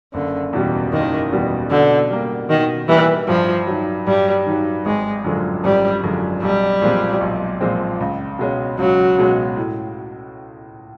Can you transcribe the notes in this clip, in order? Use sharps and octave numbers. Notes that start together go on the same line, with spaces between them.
F#1 D3
E2 B2 G3
F#1 D#3
E2 B2 G3
B2 D3
G3 A#3
B2 D#3
E3 G3 A#3
G2 F3
D#3 F#3
G2 G3
D#3 F#3
G#1 G#3
F#2 D3 F3 G#3
G#1 G3
F#2 D3 F3 G#3
B1 G3
A#2 F3 G#3 C4
B1
A#2 F3 G#3 C4
C#2
B2 G#3 C#4
C#2 F#3
B2 G#3 C#4
A2